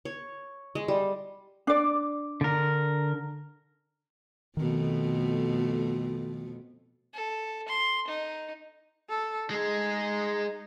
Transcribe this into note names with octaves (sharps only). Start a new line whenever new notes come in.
C#5
G#3
G3
D4 D5
D3 A#4
F2 B2 D#3 A3
A4
C6
D#4
A4
G#3 D#4 G#4